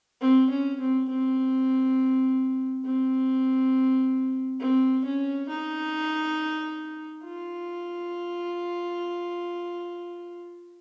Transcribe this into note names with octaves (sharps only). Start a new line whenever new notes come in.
C4
C#4
C4
C4
C4
C4
C#4
D#4
F4